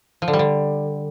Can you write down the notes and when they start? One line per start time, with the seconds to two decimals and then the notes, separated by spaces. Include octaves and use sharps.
0.22 F3
0.28 D3
0.33 G3
0.39 D3